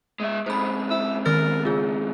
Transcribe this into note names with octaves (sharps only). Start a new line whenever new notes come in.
G#3 E5
F2 G#2 C5 B5
E4
D#3 B3 A#4 A6
C#3 F4 G#4